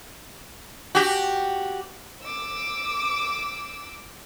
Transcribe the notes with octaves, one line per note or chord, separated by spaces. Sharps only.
F#4 G4
D6 E6